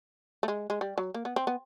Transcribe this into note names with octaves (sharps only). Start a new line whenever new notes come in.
A3
G#3
G#3
G3
F#3
A#3
B3
C4
B3